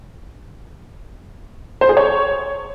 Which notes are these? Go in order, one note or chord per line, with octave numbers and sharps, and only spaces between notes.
C5
G#4
C#5